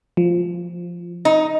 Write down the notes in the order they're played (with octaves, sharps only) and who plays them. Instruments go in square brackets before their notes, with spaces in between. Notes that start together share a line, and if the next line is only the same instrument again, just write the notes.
[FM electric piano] F3
[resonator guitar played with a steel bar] D#4